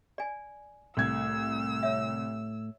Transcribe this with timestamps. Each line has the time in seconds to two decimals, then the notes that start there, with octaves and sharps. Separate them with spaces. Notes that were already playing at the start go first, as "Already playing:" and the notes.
0.18 D5 G#5
0.97 C2 A2 A3 E6 G#6
1.83 C#5 E5